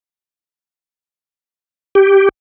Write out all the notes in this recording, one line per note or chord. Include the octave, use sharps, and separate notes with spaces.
G4